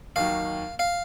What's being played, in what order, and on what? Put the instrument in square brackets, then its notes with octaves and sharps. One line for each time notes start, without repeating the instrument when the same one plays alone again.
[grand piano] D#2 D#3 F#3 [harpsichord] F5
[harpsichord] F5